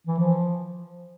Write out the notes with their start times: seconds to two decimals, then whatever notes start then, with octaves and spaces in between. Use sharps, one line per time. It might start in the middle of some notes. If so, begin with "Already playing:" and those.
0.07 E3
0.19 F3